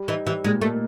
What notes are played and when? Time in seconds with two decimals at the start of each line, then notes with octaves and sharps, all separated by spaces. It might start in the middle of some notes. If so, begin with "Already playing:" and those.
Already playing: G3
0.08 E3 D#4
0.27 E3 G3
0.44 A#2 G#3
0.62 A3 A#3